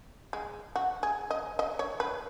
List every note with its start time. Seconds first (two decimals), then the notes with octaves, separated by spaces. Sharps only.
0.33 G#3
0.76 F#4
1.03 G#4
1.31 D#5
1.59 D#5
1.79 C#5
2.00 B4